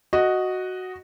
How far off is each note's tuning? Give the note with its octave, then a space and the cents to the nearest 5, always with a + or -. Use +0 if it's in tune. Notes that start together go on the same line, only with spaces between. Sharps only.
F#4 +0 D#5 +0